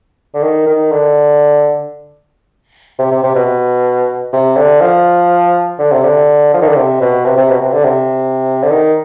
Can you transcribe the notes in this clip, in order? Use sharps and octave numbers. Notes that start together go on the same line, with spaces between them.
D3
D#3
D#3
D3
C3
C3
C3
B2
C3
D3
F3
D3
C3
D3
F3
D#3
D3
C3
B2
C3
C3
B2
C3
D3
C3
D3
D#3